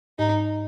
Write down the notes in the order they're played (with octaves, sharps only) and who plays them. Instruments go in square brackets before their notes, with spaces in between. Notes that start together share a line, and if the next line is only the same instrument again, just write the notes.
[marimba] G#2 [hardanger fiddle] D#4